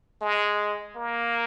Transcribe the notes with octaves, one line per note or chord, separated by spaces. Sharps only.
G#3
A#3